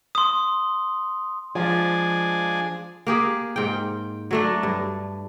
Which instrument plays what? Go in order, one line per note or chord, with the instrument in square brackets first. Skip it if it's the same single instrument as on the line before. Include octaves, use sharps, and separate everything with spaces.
[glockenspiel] C6 D#6
[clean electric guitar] F3 [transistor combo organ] G#3 D4 G#4
[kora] A#3 G4 G#4
G#2 G5
F#3 A3 D4
G2